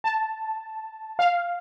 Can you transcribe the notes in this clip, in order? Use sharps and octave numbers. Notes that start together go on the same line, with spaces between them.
A5
F5